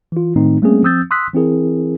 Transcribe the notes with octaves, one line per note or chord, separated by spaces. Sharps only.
E3 F4
A2 D#3 A3 C4 D#4
G3 A3 A#3 C4 C#4 G#4
F3 C4 D#6 E6 G6 A6
C6 D#6 E6 F#6 B6
E3 C4 E4 G#4 A#4